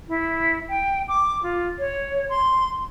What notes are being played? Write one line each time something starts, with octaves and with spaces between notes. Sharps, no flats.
E4
G5
D6
F4
C#5
C6